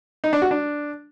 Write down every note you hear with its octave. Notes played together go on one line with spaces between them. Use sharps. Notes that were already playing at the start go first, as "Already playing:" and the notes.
D#4
D4
F#4
D4